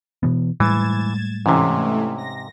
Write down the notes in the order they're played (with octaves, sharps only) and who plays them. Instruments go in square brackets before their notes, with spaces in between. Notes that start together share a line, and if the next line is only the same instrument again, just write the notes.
[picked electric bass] B2 E3 B3
[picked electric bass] A2 G3 G#3 [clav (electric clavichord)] E3 [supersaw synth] G#6 A6 E7
[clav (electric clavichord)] G#2 C3 [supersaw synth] E3 A3 C#4
[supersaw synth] A#6